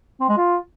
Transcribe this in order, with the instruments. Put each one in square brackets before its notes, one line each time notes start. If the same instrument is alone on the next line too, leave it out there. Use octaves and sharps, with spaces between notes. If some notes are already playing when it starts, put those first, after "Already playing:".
[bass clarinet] C4
G#3
F4